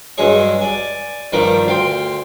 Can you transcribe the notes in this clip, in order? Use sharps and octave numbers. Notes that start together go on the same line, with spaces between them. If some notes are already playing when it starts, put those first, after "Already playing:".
G2 F#3 G#3 G#4 C#5
D5 G#5
G2 D#3 F3 A#3 A#5 D6
D2 F5 G5 C6